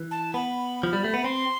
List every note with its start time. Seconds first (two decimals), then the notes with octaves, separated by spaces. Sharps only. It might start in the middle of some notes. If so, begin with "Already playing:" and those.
Already playing: E3
0.11 A5
0.34 B3 B5
0.83 F3
0.93 G3
1.04 A3
1.14 B3
1.24 C4 C6